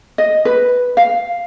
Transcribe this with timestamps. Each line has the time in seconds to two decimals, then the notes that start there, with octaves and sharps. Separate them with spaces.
0.18 D#5
0.45 B4
0.97 F5